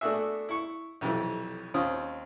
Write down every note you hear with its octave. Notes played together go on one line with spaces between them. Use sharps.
A3 B3 D4 F#4 G#4 E5
E4 C#6
B1 F2 C3 E3 F#3
D#2 C4 C#4 F4 D#6